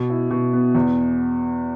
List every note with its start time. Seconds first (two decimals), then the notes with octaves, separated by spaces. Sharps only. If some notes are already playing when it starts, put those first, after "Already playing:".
Already playing: B2
0.10 E4
0.31 B2
0.53 B3
0.75 E2